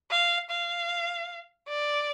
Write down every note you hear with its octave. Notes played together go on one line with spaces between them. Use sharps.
F5
F5
D5